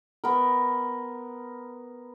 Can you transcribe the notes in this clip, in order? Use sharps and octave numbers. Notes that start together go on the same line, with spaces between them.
B3 A#4